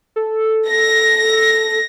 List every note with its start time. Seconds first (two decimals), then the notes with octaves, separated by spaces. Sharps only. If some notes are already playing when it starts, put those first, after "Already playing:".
0.16 A4
0.69 A#6